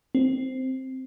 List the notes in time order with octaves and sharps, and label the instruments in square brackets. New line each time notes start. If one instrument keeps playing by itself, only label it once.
[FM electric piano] C4